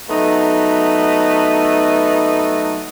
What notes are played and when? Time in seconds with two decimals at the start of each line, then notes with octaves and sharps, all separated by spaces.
0.08 F#3 A3 B3 D#4